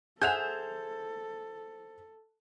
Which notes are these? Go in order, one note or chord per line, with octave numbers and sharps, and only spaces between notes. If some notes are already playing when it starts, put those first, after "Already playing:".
G#4 A4 C5 E5 F#5 G#5 G6 F7